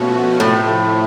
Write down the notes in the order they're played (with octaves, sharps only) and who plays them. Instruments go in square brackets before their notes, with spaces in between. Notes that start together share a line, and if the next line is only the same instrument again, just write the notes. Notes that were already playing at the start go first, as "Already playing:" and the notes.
Already playing: [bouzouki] B2 [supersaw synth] F3 A3 C#4 F#4
[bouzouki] A2 [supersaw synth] C3 F3 A3